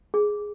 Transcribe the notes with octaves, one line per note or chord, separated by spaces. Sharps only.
G#4